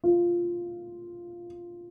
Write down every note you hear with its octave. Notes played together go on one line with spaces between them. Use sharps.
F4